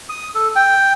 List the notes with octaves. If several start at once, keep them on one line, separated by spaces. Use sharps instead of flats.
D#6
A4
G5